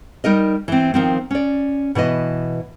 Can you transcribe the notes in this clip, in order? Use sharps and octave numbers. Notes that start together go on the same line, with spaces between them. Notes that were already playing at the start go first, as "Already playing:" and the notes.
G3 D#4 A#4 D#5
E3 C4
D#3 F3 C4
C#4 D5
B2 E3 B4 D#5